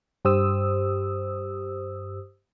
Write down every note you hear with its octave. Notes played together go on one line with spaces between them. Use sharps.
G2 G4 C5 D#6 E6